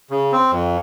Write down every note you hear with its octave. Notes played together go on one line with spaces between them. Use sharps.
C#3
C4
F2